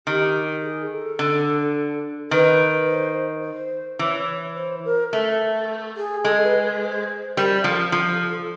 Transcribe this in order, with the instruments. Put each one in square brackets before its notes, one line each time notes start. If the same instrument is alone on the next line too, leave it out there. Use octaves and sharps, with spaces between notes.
[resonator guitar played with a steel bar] D#3 [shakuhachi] G4
[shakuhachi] G#4
A4
[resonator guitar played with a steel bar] D3
[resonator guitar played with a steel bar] D#3 [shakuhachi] B4
[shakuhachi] C5
C5
[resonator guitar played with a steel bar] E3 [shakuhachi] C#5
[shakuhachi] C5
A#4
[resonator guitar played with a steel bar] A3 [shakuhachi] A4
[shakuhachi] G#4
[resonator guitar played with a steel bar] G#3 [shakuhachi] A4
[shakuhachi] B4
C5
[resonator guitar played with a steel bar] G3 [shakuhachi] A#4
[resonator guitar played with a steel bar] F3 [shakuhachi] A4
[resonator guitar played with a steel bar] F3